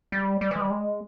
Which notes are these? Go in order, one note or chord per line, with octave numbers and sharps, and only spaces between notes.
G3
G3
E3
G#3
G3
G#3